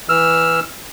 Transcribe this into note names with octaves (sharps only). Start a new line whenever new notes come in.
E3 E6 F6